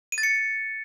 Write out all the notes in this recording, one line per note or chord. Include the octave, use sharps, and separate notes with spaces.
D#7
A6
C#7